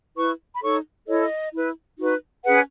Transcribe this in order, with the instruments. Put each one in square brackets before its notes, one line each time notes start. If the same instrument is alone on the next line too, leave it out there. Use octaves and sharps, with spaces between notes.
[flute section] E4 B4 C#6
B5
D#4 A4 C#5 C#6
E4 A4 C#5 D#5
E4 B4
D#4 F#4 B4
C#4 G#4 B4 F#5